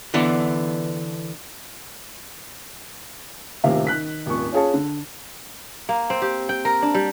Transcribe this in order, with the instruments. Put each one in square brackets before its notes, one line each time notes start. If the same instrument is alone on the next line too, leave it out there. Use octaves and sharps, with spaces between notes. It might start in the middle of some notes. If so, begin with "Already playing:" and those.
[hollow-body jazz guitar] D3 E3 B3 D4
[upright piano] D#1 D#2 A2 C3 E5 F5
D#3 F#6 B6
D#1 G#1 C#6
C#4 F4 G#4 C#5 F5 A5
D3
[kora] A#3
C4
G4
G5
A#4
D4
G3